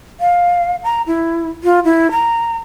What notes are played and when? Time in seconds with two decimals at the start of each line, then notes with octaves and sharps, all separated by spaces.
0.20 F5
0.84 A#5
1.07 E4
1.64 F4
1.85 E4
2.11 A#5